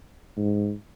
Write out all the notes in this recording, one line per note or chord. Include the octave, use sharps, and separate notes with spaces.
G#2